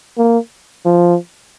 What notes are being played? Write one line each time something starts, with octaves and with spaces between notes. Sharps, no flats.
A#3
F3